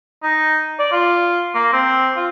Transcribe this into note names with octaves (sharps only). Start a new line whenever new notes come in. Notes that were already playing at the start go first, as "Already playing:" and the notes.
D#4
D5
F4
A#3
C4
F4